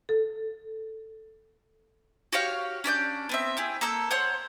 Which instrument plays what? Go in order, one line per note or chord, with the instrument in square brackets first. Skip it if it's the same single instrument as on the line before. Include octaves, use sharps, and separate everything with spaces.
[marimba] A4
[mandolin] F#4 G4 C#5 F5
C#4 D4 D5 G6
B3 C4 E5
E4 G4 G#4
A#3 A4 E6 G6
C5 C#5 F#5 C6